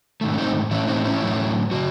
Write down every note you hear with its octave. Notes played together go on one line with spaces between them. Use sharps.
G#2 D#3 A3
C#4
C4 D#4
A2 E3 A3 C#4 E4
C4 D#4
C#4 E4
A2 F#3 A3
C#3 F#4